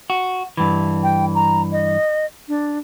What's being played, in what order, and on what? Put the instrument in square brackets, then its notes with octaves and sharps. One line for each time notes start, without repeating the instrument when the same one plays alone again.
[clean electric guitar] F#4
G2 E3
[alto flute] G5
A#5
D#5
D4